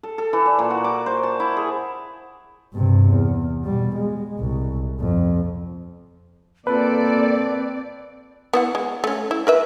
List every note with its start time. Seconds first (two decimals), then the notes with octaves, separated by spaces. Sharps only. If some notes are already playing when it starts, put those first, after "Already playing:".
0.03 A4
0.18 A4
0.33 E3
0.46 D5
0.59 A#2
0.70 F#4
0.84 D6
1.06 C5
1.23 A5
1.40 E4
1.57 G#4
2.73 G2 C3
3.10 E2
3.65 B2 G3
3.95 G#3
4.39 C2
5.00 F2
6.67 A#3 C4 F4 A4 B4 D5
8.53 B3 E4 F#5
8.75 G#3
9.04 A3 C#4
9.31 E4
9.47 A#4 B4 E5